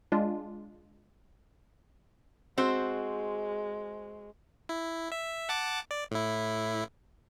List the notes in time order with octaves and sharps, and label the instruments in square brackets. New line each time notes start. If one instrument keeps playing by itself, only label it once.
[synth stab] G#3 D4 F4
[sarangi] G#3 [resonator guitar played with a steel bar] C4 F#4 C5
[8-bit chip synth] E4
E5
F#5 A5 D6
D5
A2 E4